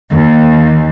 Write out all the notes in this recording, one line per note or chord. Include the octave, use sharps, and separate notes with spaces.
D#2